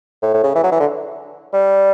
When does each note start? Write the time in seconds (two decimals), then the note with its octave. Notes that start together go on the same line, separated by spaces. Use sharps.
0.23 A2
0.34 A2
0.44 C#3
0.55 E3
0.63 F#3
0.72 E3
0.80 D3
1.53 G3